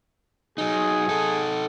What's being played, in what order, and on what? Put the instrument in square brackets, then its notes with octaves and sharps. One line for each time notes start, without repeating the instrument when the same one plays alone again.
[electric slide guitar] F#3 D#4 [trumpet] G#4
[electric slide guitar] D#4 A4